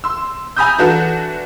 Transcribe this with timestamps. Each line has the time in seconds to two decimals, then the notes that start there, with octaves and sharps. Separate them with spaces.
0.04 C6 E6
0.56 G#5 A#5 B5 D#6 E6 G6
0.78 E3 D4 F#4 A4